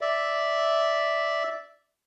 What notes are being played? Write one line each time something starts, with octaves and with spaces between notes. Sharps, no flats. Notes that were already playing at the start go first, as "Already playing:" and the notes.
D5 E5